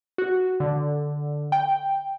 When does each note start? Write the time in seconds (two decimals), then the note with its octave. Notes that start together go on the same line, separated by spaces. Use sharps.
0.18 F#4
0.60 D3
1.52 G5